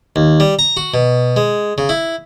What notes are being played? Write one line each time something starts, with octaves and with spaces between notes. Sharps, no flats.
D#2
G3
A#5
F#4
B2
G#3
C#3
E4